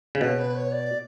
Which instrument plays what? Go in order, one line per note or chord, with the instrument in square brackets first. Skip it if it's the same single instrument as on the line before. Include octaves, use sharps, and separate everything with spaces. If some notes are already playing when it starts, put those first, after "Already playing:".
[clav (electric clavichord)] C#3
[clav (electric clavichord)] B2 [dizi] C#5
[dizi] B4
C#5
D5